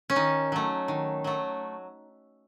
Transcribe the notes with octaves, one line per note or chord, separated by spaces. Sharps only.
C#4
D#3 D#4
F#3 A3
D#3
F#3 A3